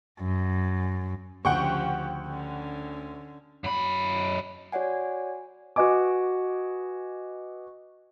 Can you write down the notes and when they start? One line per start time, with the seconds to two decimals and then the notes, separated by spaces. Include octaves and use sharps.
0.20 F#2
1.45 D2 C#3 F3 G4 F#5 G5 C#6
2.26 D3 C#4
3.64 F#2 B5
4.72 F#4 C#5 D5 F#5 G#5
5.76 F#4 B4 D#5 G#5 D6